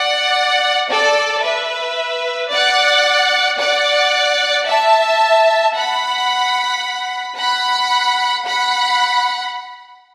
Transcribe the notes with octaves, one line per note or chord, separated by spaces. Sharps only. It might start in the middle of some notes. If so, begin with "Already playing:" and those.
Already playing: D5 F#5
A4 D5
B4 E5
D5 F#5
D5 F#5
E5 A5
F#5 B5
F#5 B5
F#5 B5